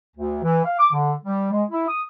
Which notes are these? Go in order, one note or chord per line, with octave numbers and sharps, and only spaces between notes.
D2
E3
F5
D6
D3
G3
G#3
E4
D#6